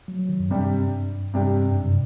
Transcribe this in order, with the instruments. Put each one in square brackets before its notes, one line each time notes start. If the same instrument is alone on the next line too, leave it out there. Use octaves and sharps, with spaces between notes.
[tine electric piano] F#3
F#3
D#3
F#2
[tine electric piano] G2 [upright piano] C3 G3 D4 G4
[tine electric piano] G2 [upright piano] C3 G3 D4 G4
[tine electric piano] F#2
G2
C3